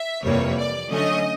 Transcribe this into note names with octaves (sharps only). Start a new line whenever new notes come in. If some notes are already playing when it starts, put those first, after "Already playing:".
Already playing: E5
F2 C3 E3 G3 A#3 C#5
D5
D3 F#3 A3 C#4 D#5